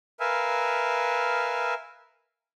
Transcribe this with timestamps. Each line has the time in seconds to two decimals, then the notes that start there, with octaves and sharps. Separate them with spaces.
0.20 A#4 B4 E5 F5 G#5